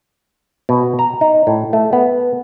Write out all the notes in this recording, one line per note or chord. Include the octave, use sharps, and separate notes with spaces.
B2
A#5
D#4
A2
A3
B3